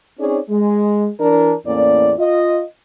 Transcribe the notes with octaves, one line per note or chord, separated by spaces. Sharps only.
C4 C#4 D#4 G#4 C#5 D5
G#3
E3 D4 A#4
E2 A2 A#3 C#4 D5
F4 D#5